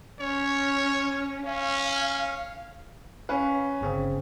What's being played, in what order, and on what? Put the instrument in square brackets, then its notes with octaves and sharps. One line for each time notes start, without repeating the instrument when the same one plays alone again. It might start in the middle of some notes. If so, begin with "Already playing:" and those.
[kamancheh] C#4 [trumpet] C#5
[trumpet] C#4 [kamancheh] F5
[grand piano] C#4 B4 [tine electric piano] F5
[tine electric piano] G1 C#3 C4